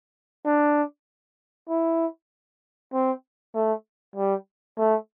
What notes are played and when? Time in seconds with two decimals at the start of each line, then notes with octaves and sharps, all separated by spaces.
0.46 D4
1.69 E4
2.93 C4
3.54 A3
4.16 G3
4.77 A3